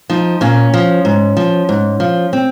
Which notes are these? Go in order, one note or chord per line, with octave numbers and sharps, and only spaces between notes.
F3 D#4
A#2 C#4
F3
G#2
F3
G#2
F3
C4